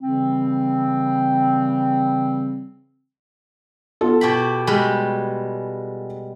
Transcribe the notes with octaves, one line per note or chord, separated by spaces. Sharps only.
C#3 E3 G3 C4
B3 F4 A4
B2 G4 B5
G3 G#3 B4